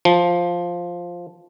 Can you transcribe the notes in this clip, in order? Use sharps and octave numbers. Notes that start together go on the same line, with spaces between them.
F3